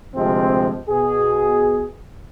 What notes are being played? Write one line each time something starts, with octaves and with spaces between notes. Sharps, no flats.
D2 C3 F3 G#3 C4
B2 G#4